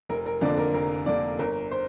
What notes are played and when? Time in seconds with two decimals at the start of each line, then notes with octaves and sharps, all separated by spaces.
0.09 F1 A#4
0.26 A#4
0.41 F2 D3 A#3 D4 D5
0.57 A#4
0.74 F1 A#4
1.06 F2 D3 A#3 D4 D5
1.39 G1 A#4
1.71 C5